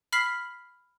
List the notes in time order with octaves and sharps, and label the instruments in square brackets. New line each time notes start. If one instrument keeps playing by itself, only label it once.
[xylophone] B5 F6 B6 C7 F#7